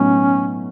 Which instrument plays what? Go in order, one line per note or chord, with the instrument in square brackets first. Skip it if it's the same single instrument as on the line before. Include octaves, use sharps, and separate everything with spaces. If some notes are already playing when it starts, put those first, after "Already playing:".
Already playing: [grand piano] A2 F#3 B3 D#4 [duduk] C#4